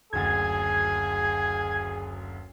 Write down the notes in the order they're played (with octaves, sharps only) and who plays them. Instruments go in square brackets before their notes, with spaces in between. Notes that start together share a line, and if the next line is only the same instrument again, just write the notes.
[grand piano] F#1 D2 A6 [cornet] G#4 [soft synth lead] G#6